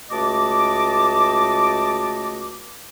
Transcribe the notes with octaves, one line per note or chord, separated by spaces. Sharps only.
C#2 A3 F#4 D#5 A5 D6